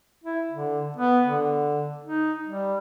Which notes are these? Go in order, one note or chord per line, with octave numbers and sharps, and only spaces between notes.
E4
D3
B3
D3
D#4
G3